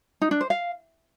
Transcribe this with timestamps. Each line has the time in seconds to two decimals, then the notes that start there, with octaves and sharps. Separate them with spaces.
0.22 D#4
0.31 D4
0.41 C5
0.50 F5